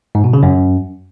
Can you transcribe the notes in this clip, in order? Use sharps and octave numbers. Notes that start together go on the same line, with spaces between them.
G#2
B2
C#3
F#2